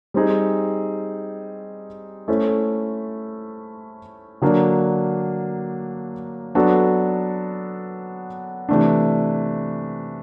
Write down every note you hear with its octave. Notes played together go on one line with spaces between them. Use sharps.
G3 C4 D#4 G#4
A3 C#4 E4 A4 C5
D3 F#3 A#3 D4
F#3 B3 D4 F#4 A4
C3 E3 A3 D4